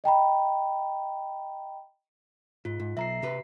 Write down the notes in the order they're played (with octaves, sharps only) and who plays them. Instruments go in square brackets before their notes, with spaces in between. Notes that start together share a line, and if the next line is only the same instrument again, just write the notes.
[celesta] D#5 G5 A#5 B5
[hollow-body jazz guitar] G#2 [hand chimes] F4
[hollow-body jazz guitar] G#2
[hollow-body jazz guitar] B1 [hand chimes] E5 A#5 C7
[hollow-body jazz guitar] C3 G4 B4